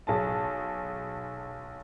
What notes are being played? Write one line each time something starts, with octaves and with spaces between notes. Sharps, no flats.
B1 G#4 A5